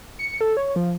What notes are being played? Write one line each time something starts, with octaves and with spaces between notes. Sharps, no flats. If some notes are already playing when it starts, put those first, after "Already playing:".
C#7
A4
C#5
F3